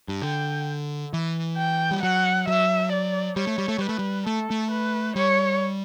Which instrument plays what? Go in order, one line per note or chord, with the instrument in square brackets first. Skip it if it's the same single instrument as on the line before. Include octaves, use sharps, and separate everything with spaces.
[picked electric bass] G2
[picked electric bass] D3 [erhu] G5
[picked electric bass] E3
[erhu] G5
[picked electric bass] G3
[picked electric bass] F#3 [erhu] F#5
[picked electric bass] F#3 [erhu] E5
[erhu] D5
[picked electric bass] G3 [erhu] C#5
[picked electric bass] A3
G3
A3
[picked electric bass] G3 [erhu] B4
[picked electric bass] A3
G3
[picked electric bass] A3 [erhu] A4
[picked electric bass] A3
[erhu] B4
[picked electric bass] G3 [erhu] C#5